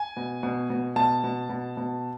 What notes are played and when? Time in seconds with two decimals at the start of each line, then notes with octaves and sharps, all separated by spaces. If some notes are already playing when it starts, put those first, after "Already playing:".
Already playing: G#5
0.17 B2
0.43 B2
0.70 B2
0.96 B2 A5
1.24 B2
1.49 B2
1.77 B2